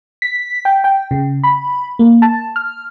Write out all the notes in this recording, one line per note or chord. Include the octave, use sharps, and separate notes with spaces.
B6
G5
G5
C#3
B5
A#3
A5
F6